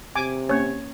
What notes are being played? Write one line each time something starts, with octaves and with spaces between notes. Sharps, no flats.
C3 G#5 D6
A#3 C#4 C#5